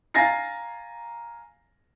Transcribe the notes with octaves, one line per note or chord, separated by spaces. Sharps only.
F5 G#5 A#5 A6 A#6 C7